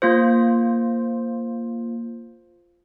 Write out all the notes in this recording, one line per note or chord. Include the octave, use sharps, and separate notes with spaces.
A#3 F4 C5